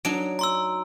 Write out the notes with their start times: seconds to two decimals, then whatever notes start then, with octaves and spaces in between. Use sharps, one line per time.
0.05 F#3 D4 D#4 D7
0.39 A#5 C6 E6